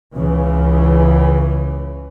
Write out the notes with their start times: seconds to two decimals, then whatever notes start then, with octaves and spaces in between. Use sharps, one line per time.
0.15 C#2 C#3 E3